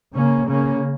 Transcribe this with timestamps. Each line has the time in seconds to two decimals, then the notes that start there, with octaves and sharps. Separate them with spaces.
0.15 C#3 A#3 C#4
0.46 C#3 A#3 C#4